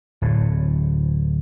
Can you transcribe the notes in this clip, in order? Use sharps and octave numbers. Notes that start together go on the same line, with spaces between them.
D1 A2